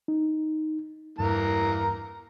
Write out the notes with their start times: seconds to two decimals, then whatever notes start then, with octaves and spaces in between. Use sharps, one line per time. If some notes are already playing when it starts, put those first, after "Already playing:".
0.08 D#4
1.19 E2 G2 E3 A#3 A#5